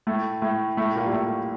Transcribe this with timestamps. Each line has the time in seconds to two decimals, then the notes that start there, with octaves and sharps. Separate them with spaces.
0.07 A2 A3
0.42 A2 A3
0.77 A2 A3
0.96 A#2 A#3
1.06 G3
1.13 A2 A3